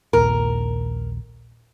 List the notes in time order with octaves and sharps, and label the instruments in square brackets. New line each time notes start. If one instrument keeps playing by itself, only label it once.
[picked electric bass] A#1 D#2 A#2 [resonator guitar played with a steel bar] A#4